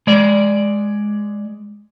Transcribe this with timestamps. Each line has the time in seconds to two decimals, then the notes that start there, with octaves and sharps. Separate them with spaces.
0.07 G#3 D5